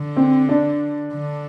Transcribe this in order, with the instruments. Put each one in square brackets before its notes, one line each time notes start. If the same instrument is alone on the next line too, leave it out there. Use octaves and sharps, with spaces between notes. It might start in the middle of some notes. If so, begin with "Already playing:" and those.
Already playing: [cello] D3
[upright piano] C4
D4
[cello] D3